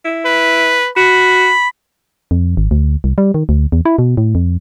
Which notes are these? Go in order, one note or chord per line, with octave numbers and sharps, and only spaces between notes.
E4
B4
F#4 B5
F2
G#1
D2
C2
G3
D#3
D2
E2
E4
B2
A2
F2